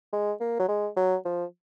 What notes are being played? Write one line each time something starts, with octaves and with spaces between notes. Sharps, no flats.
G#3
A#3
F#3
G#3
F#3
F3